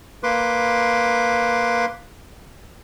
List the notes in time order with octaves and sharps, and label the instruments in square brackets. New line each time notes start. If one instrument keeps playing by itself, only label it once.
[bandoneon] A#3 B4 C6 D6